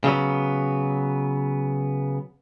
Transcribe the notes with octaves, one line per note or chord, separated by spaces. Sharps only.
C#3 F#3 B3